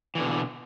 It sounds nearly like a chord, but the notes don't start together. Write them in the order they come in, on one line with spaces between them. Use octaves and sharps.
E3 D3 B2